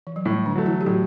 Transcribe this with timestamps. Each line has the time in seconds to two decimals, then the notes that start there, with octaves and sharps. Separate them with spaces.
0.07 E3
0.16 F#3
0.25 A2 G3
0.46 D3 D4
0.55 F#3 A3
0.66 E3 E4
0.81 G4
0.86 A2 F#3 F#4